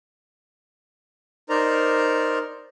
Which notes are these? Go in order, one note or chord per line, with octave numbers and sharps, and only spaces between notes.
D#4 A#4 C5 D5 A#5